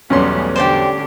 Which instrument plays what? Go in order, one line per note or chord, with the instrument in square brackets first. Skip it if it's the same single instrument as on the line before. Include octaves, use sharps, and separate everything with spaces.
[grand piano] B1 E2 C6 [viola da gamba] G3 A3 B3 [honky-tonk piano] C#4
[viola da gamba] D3 D4 G4 [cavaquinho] C5 D5 G5